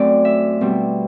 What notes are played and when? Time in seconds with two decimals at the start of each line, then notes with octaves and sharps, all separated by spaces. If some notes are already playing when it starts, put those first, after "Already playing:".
Already playing: F#2 F#3 A3 C4 D5
0.25 E5
0.61 B2 G3 C4